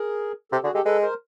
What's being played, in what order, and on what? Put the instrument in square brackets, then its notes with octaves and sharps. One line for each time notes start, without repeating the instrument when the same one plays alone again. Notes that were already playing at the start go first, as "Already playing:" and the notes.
Already playing: [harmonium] G#4 A#4
[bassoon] C3 [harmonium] G4 A4
[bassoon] D3 [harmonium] F#4 G#4
[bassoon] G#3 [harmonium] G4 A4
[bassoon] G#3 [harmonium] A4 B4
[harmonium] A#4 C5